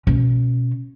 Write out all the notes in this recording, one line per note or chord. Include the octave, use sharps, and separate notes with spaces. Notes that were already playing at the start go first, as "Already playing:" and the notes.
B2 C#4